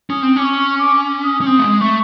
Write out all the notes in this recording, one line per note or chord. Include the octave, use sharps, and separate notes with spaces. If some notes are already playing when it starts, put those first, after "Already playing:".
C#4 D#6
C4
C#4 D6
C#6
D6
D#6
C#4
C4 D#6
A3
G#3
A3 C#6